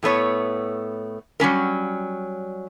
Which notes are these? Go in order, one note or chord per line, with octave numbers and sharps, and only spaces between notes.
A2 A3 B3 C#5
F#3 G3 C#4 A#4